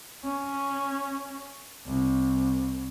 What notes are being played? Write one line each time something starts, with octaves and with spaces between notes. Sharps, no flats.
C#4
C2